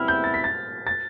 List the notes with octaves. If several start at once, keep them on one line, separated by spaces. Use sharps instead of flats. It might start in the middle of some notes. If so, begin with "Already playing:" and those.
Already playing: C3 G3 B3 E4 F6
G6
A6
B6
A6
A6